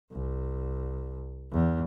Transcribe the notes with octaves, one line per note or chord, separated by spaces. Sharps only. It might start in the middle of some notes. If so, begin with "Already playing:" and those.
C2
E2